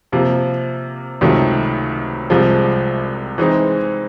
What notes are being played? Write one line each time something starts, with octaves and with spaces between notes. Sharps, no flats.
C3 F3 A#3
C#2 C3 D#3 F#3 A3
C2 C3 F3 G#3
E3 G#3 C4 D#4